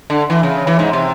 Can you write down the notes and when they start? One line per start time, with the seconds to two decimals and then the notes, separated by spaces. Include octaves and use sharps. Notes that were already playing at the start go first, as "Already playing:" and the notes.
0.10 D3
0.30 E3
0.43 C#3
0.67 E3
0.79 G#2
0.93 C3